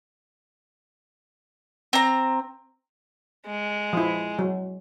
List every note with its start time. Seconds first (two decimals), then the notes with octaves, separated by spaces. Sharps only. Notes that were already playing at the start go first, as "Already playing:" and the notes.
1.93 C4 A#5
3.46 G#3
3.93 F3 E4
4.39 F#3